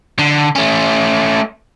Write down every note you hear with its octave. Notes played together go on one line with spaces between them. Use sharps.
D3
A3 C#4